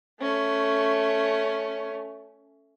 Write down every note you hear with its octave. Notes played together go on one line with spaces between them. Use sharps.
A3 C#4